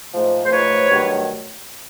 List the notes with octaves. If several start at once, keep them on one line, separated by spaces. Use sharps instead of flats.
G#2 F3 A3
C5
G#2 F3 A3 B4 C#5
G2 D#3 F#3 A3